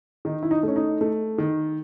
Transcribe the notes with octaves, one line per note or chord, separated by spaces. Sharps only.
D#3 D#4
E4
D#4
A3 C#4
D#4
A3
D#3